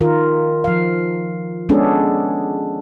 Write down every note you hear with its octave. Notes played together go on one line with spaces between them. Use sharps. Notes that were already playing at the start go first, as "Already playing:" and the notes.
D#3 F4 A#4
F3 F5
G#3 B3 C#4 D4 G#4 A4